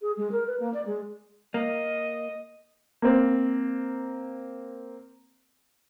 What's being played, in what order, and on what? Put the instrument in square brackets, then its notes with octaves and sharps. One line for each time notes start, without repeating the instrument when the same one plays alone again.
[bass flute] G#4
G#3
A#4
B4
A#3
D5
G#3
[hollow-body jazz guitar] A#3 [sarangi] D#5
[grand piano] A#3 C4